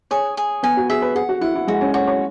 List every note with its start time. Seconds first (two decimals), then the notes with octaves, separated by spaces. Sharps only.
0.11 G#4 C#5
0.37 G#4
0.63 B3 G#5
0.77 F#4
0.90 G#4 E5
1.02 B4
1.15 G#4 F#5
1.29 F#4
1.41 E4 F#5
1.55 E4
1.68 G#3 F#4
1.81 C#4
1.94 F#4 C#5
2.07 C#5